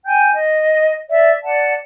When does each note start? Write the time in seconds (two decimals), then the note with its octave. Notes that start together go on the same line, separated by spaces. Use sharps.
0.06 G5 G#5 G6
0.33 D#5
1.09 D5 E5
1.43 D5 F#5 A5